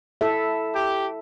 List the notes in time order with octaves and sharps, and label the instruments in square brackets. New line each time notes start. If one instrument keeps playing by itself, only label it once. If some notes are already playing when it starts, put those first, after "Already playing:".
[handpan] E4 A4 E5
[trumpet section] G4